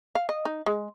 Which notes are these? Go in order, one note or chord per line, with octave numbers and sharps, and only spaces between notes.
F5
D#5
D#4
G#3